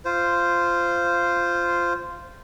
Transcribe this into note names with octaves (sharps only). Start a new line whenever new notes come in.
F4 C5